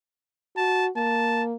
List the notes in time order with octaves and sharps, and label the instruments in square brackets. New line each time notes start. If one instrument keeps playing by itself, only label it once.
[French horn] F#4 [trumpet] A5
[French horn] A#3 [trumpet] A5